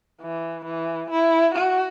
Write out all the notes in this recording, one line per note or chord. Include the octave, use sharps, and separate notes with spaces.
E3
E3
E4
F#4